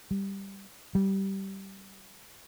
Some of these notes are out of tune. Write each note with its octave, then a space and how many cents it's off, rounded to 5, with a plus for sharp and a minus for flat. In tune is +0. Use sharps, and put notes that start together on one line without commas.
G3 +5
G3 -15